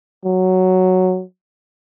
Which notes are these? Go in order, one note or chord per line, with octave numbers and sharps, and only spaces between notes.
F#3